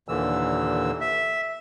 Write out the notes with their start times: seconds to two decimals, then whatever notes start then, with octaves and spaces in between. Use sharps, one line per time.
0.08 D#2 A#2 D3 E3 E6
1.01 E5